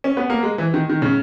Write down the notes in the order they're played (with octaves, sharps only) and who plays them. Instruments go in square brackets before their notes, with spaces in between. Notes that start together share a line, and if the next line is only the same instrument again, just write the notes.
[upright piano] C#4
B3
A#3
G#3
E3
D#3
D#3
C#3